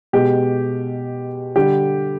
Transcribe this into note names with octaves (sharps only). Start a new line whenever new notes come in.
B2 G#3 G4
D3 G3 G4